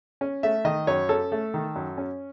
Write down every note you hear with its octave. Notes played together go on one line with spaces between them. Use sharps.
C#4
A3 E5
D#3 D#5
F#2 C#5
C#4 A4
A3
D#3
F#2
C#4